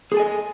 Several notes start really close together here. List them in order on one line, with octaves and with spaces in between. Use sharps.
G#4 A4 G#5 D#5